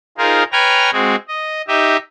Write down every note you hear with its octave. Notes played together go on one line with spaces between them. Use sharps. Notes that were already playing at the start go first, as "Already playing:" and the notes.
D#4 F4 G#4 A#4 C5
B4 C#5 G5 G#5 A#5 F6
G#3 C4 F#4 G#4
D#5
D#4 G4 D#5 E5